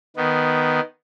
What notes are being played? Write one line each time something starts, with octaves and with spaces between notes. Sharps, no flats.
D#3 B3